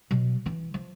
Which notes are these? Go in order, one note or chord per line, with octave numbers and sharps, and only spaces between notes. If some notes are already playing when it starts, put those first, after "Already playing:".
B2 F#3
E3 E4
F3